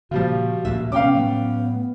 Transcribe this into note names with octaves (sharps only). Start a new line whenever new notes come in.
G2 A#2 C#3 F3 G3 F4 F#4
D2 A#2 A#3 E5
C3 G3 B3 C#4 F5 G5 D6
A2 F#3 A3 B3